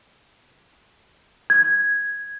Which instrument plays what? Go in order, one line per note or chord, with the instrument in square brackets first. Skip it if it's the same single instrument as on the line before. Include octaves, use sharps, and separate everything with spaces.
[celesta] G#6